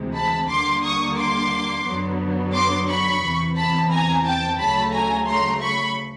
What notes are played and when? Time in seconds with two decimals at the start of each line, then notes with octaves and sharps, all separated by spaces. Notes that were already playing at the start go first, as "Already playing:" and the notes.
Already playing: D2 C3 E3 G#3
0.14 A5 B5
0.49 D#2 D3 G3 A#3 C6 D6
0.83 C#6 D#6
1.17 C6 D6
1.85 F#2 D3 F#3 B3
2.53 C6 D6
2.88 B5 C#6
3.22 E2 C3 E3
3.56 A5 B5
3.90 G#5 A#5
4.25 G5 A5
4.58 D2 C#3 F#3 A3 A5 B5
4.93 G#5 A#5
5.27 A#5 C6
5.61 B5 C#6